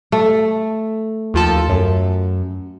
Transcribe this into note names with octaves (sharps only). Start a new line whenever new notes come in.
A3
D#2 F3 A4
F#2